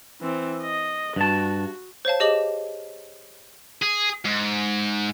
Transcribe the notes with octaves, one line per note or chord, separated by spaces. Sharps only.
E3 C4
D#5
G2 F#4 A5
C5 C#5 F5 A5
G4 G#4 D#5 D6 E7 F#7
G#4
G#2